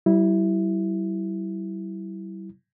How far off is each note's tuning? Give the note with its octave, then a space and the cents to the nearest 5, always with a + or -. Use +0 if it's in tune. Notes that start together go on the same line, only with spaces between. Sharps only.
G3 -40 E4 +0